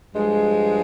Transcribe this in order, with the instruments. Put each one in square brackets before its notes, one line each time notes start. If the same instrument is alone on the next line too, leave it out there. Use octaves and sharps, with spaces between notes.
[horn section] G2 F3 G#3